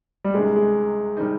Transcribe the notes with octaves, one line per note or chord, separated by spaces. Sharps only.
G3
C#2 C3 D#3 G#3
G#3
C3 D#3 G3 C4 D#4